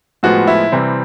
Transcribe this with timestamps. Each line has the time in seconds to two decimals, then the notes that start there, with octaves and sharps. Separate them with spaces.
0.23 A2 F3 G#3 B3 F#4
0.47 E4
0.72 C3 E3 G3 C4